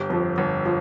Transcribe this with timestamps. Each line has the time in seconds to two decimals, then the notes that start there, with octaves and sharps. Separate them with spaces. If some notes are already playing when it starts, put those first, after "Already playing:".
Already playing: G1 G4
0.10 F2 F3
0.38 G1
0.65 F3